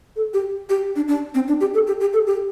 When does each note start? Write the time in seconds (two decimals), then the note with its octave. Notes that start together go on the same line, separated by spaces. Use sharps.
0.16 A4
0.34 G4
0.69 G4
0.96 D4
1.08 D4
1.35 C4
1.48 D4
1.61 G4
1.74 A4
1.87 G4
2.00 G4
2.13 A4
2.27 G4